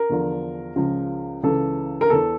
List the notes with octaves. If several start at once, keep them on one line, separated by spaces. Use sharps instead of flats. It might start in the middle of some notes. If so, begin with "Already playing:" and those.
Already playing: A#4
E2 D3 F3
C#2 C#3 F3
C#2 C#3 E3 A4
A#4
E2 E3 A4